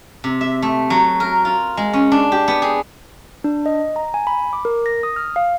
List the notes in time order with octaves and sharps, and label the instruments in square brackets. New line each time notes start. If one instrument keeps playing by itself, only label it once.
[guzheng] C3
E5
A3
F#3
A#4
F4
G#3
C#4
D4
G4
B3
G#4
[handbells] D4
D#5
A#5
G#5
B5
D6
A#4
A#6
D#6
F6
F5